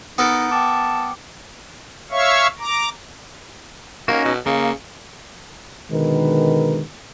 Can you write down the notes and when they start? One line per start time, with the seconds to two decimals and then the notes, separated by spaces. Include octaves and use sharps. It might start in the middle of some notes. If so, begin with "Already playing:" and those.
0.18 B3 D#4 A4 A#4 D#6
0.51 G5 A5 D6
2.10 C#5 E5 F5 C#6
2.59 A#5 D6
4.08 A#3 C#4 D#4 F#4
4.25 B2
4.46 C#3 A#3
5.92 B2 D3 D#3 G#3 A#4 B4